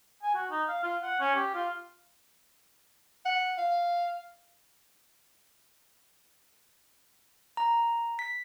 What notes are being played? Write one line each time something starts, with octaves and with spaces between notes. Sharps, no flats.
G#5
F#4
D#4
F5
F4
F#5
C#4
G4
F4
F#5
F5
A#5
B6